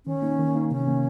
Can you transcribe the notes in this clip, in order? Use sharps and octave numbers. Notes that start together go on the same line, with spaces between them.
D#3 C#4
A#3 D#4
D#3
A#3 D#4
C3 C#4
D#3 A#3